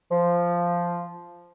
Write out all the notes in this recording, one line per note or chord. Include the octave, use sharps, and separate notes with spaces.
F3